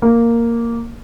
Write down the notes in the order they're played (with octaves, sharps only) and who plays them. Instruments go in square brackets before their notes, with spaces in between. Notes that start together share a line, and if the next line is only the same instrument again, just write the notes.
[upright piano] A#3